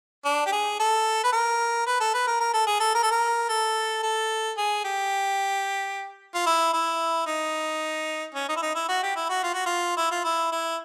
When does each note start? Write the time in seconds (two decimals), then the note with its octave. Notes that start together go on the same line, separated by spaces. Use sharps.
0.25 D4
0.46 G4
0.52 G#4
0.79 A4
1.24 B4
1.33 A#4
1.86 B4
2.00 A4
2.14 B4
2.27 A#4
2.40 A#4
2.54 A4
2.66 G#4
2.80 A4
2.95 A#4
3.03 A4
3.11 A#4
3.49 A4
4.03 A4
4.57 G#4
4.84 G4
6.35 F4
6.46 E4
6.73 E4
7.26 D#4
8.34 C#4
8.49 D#4
8.56 E4
8.62 D#4
8.75 E4
8.88 F#4
9.03 G4
9.16 E4
9.29 F#4
9.43 F4
9.54 F#4
9.66 F4
9.97 E4
10.11 F4
10.24 E4
10.52 E4